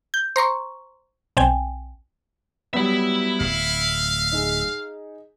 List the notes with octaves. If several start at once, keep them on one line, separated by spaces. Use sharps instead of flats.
G6
C5 A#5 C6 C#6
B1 C4 G5 G#5
F#3 G3 B3 E5 B5
D1 F5 B6 F#7
D#4 G#4